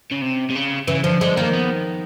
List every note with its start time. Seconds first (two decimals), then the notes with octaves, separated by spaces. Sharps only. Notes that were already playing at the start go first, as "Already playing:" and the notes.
0.11 C#3
0.22 C3
0.50 C3
0.55 C#3
0.88 C#3 E3
1.04 D3 F3
1.21 D3 G#3
1.37 D#3 A#3
1.54 B3